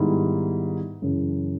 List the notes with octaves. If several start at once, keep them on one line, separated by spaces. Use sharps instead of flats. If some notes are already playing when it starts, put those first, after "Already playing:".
Already playing: G#2 D#3 G3 B3 E4
F#2 C#3 E3